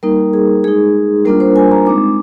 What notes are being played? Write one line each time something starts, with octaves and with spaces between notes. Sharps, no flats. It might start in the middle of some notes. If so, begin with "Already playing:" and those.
G3 A#3 D#4 A#4
G#4
G#3 D#4 G#4
G3 A#3 D4 F4 A#4
C5
G#5
A#5
G#3 C4 D#4 D6